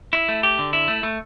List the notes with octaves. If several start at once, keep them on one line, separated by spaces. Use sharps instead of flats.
E4
A3
G4
D3
E4
A3
A3